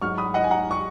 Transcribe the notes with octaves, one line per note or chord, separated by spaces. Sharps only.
G#2 F#3 C#6 F6
B5 D#6
D#5 F#5
G#5
F#5 A#5
C#6